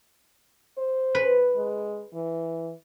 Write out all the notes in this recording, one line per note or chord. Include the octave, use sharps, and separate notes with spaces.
C5
B4
G#3
E3